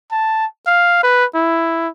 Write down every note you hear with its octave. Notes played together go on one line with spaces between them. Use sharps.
A5
F5
B4
E4